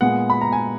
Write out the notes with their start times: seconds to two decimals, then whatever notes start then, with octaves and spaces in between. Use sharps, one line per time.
0.01 A#2 G#3 B3 F#5
0.30 B5
0.41 A#5
0.52 G#5